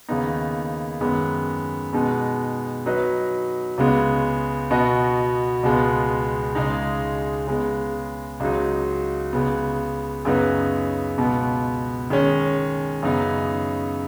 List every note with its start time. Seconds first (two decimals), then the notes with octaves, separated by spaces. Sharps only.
0.09 D#2 C#3 B3 D#4
1.01 F#2 D#3 G#3 B3
1.93 B2 G#3 B3 D#4
2.86 F#3 D#4 B4 D#5
3.78 C#2 C#3 G#3 B3
4.71 B2 B3 F#4 D#5
5.63 C#2 B2 G#3 B3
6.55 C#2 C#3 G#3 D#4
7.47 C#3 G#3 B3
8.40 C#2 C#3 F#3 D#4
9.33 C#2 C#3 B3
10.25 F#2 C#3 B3 D#4 B4
11.18 C#2 B2 B3
12.10 D#3 G#3 C#4
13.02 F#2 C#3 B3 D#4